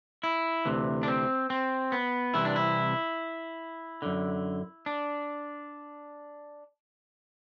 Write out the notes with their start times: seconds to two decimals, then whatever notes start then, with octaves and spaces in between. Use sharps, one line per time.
0.23 E4
0.65 D2 C3 E3
1.03 D4
1.08 C4
1.50 C4
1.92 B3
2.34 C2 C3 E3 E4
2.45 D4
2.56 E4
4.02 F#2 D3
4.86 D4